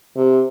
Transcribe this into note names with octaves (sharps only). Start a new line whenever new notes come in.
C3